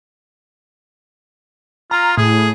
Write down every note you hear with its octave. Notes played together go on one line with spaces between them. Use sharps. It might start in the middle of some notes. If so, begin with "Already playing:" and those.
F4 A#5
A2 G#4